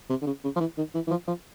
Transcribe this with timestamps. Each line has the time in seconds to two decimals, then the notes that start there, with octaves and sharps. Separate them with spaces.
0.10 C3
0.21 D3
0.26 C#3
0.44 C#3
0.56 F3
0.60 E3
0.77 D#3
0.95 E3
1.07 E3
1.10 F3
1.27 F3